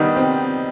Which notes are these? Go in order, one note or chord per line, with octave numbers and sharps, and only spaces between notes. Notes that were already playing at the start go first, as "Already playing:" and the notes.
Already playing: D#3 G3 B3 D#4
C4